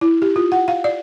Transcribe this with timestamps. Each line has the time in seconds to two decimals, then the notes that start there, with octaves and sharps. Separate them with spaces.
0.01 E4
0.22 G4
0.36 F4
0.52 F#5
0.68 F5
0.84 D5